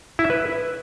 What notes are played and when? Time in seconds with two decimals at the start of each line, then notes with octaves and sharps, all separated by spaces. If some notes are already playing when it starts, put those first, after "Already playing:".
0.19 E4
0.24 E5
0.30 B4